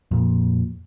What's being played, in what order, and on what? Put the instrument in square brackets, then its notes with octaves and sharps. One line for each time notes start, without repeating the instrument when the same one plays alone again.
[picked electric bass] F2 A#2